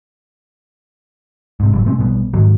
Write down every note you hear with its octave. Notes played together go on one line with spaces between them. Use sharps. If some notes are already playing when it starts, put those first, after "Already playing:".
G#2 C3
F#1 A2 F#3 G3
C3 A3 C4 C#4
A#1 B2 G3 B3
G#2 D#3 F#3